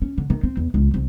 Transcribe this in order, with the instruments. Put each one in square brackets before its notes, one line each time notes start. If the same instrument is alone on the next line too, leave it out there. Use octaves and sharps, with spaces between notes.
[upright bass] C#4
D3
D#3
C4
E2
C#2
C2